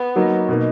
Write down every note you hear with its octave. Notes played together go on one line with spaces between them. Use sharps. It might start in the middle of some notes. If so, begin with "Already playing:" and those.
Already playing: B3
F#3 A#3 D#4 F#4
B2 A#3 D#4